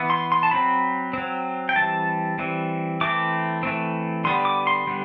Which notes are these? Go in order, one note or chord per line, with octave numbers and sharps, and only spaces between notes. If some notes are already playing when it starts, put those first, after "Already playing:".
Already playing: E3 B3
C6
C6
A5
F#3 C4 B5
F#3 C4
G5
E3 G3 C4 A5
E3 G3 C4
E3 A3 C4 D6
E3 A3 C4
D3 G3 B3 C6
D6
C6
D3 G3 B3